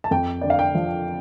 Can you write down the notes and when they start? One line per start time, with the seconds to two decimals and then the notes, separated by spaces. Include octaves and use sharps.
0.04 A5
0.11 F2 G5
0.41 D3 D5
0.50 F5
0.59 G5
0.75 F3